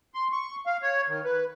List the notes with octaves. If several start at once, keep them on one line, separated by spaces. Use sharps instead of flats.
C6
C#6
F5
C#5
D#3
B4